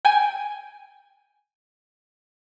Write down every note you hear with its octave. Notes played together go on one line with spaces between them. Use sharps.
G5 G#5